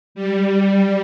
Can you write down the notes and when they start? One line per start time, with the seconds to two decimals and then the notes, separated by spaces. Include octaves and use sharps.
0.15 G3